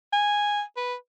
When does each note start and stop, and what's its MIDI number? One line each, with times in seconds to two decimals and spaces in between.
0.13 0.63 80
0.77 0.95 71